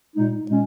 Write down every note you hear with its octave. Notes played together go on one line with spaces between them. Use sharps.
A#2 G#3 D#4
A#2 G#3 C#4